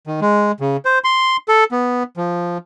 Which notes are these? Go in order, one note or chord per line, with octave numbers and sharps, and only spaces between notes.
D#3
G#3
C#3
C5
C6
A4
B3
F3